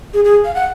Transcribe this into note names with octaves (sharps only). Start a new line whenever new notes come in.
G#4
G#4
F5
F#5